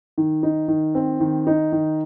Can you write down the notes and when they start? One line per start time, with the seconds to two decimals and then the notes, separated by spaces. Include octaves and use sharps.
0.18 D#3
0.43 D#4
0.68 D#3
0.95 C4
1.20 D#3
1.47 D#4
1.72 D#3